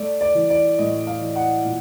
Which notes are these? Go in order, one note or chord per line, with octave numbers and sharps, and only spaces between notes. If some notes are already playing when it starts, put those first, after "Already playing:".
Already playing: A3 D5
D5
E3
D5
A2 D#5
F5
E3
F#5
A#2